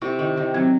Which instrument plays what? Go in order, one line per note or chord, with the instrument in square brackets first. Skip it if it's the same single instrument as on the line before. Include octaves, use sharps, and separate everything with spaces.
[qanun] C3 [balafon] E4
[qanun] D#3 [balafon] E4
[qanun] D#3 [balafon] E4
[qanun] F#3 [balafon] C4